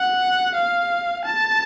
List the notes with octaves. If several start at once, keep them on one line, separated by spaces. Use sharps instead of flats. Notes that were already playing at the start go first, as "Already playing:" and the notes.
Already playing: F#5
F5
A5